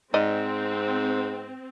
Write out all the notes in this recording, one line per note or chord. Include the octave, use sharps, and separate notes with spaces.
G#2 C4 D5 D#5